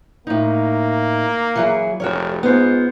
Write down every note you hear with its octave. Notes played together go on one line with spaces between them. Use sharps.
A2 A#3 D#4
E3 F#3 G#4
F1 F#4 A#4 C#5
G#2 B3 F4 C5